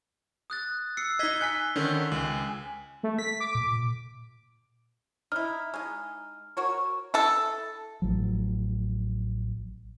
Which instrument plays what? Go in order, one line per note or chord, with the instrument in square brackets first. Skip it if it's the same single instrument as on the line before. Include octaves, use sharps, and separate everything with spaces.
[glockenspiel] D#6 F#6 A6
E6 C7 C#7
[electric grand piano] D#4 D#5 [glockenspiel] G#6 B6 G7
[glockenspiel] G#5 C#7 [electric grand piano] F#6 B6
[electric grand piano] D3 D#3 C#4
[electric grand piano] C#2 [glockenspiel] G#5 F#7
[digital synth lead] A3
B6
D6
[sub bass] A#2
[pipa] D#4 E4 [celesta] F6
[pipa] G#3 D#4
F#4 A#4 C#5
E4 A4
[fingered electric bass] A1 F3 F#3